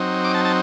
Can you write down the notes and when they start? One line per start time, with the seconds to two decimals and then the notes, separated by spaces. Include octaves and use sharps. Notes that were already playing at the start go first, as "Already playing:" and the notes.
Already playing: F#3 C4 D#4
0.24 D6
0.34 A5
0.45 A5